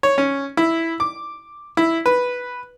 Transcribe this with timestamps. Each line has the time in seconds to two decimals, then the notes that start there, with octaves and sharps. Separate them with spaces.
0.03 C#5
0.18 C#4
0.57 E4
1.00 D6
1.77 E4
2.06 B4